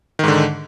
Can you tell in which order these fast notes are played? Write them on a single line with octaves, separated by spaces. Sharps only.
D#3 G#2 D3